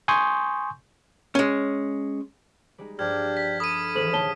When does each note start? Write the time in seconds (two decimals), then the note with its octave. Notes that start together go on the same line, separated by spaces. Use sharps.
0.08 G#5 C6 C#6 D#6 G6
1.35 G#3 C#4
2.78 G3 G#3 D#4
2.99 G2 F3 D4 G4 F6 G#6
3.37 B6
3.60 A4 D5 B5 D#6 D#7
3.95 G#1 D#2 E3 A4 C5 F#7
4.13 D#2 A#2 D3 C#5 A5 G7